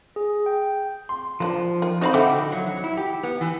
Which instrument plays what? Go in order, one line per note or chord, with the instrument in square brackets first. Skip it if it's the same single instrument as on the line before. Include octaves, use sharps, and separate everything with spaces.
[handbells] G#4
G5
[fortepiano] C6
[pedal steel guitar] F3 [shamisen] A#3 C4 D4
[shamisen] D#3
[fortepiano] C4 D#4 F#4 [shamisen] C5 F5 B5
[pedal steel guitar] D3 G5 D6 [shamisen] A4 [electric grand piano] E5 F#5
[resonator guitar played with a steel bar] F#3
F#3
E4
G4
B3
E3